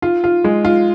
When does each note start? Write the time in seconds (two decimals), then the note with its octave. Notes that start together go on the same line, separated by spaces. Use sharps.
0.02 F4
0.24 F4
0.44 G#3
0.65 F4